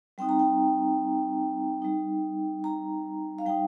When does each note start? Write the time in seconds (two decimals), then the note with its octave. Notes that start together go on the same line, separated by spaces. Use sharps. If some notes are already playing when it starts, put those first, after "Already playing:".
0.18 G3 C4 D#4 G5
0.29 A#5
0.39 G5
1.82 G3 D#4
2.64 A#5
3.39 F5
3.46 G3 D#4 G5